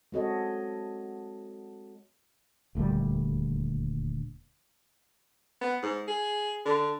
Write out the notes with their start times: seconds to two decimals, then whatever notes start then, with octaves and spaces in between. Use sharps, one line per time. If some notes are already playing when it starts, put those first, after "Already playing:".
0.12 G#3 C4 F#4 A4 C#5 D#5
2.75 D#1 D2 A#2 G3
5.62 B3
5.83 G#2
6.08 G#4
6.65 D3